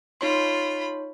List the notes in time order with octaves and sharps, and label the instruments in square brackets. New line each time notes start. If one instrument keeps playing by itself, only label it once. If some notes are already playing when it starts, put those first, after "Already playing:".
[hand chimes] D#4 C#5 C6 [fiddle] F4 B5